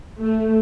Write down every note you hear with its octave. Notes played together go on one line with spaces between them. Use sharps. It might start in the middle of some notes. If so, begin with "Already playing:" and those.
A3